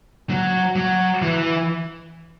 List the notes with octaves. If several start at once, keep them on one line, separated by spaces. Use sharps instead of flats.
F#3
F#3
E3